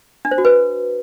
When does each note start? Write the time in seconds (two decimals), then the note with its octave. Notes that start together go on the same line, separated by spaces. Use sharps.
0.25 D4
0.31 C5
0.38 F#4
0.45 B4